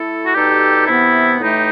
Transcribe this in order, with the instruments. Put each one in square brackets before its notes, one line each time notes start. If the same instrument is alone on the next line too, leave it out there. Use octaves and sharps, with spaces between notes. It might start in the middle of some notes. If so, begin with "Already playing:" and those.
Already playing: [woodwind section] A3 E4 A4
[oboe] F#4
[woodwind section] B2 G3 D#4 A4 [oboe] G4
[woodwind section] C3 E3 B3 [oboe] E4
[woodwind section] A2 E3 A3 E4 G4 [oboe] D#4